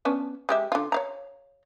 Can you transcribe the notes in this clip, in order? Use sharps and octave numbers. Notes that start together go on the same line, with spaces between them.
B3 C#4 D4
G#3 G4 E5
D3 F4
C#5 F5 A#5